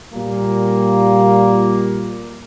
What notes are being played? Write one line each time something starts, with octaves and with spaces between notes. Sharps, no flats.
A#2 G3 A#3